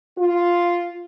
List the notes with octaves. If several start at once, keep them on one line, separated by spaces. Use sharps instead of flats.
F4